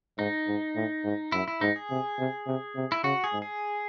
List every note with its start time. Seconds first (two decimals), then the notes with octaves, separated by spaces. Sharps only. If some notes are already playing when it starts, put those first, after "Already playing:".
0.19 G#2 D#4
0.47 G#2
0.76 A2
1.04 G#2
1.32 F#2 E4
1.48 E4
1.61 G#2 D#4
1.76 G#4
1.90 C3
2.18 C3
2.47 C3
2.76 C3
2.92 E4
3.04 C#3 F#4
3.24 G#4
3.33 G#2
3.42 G#4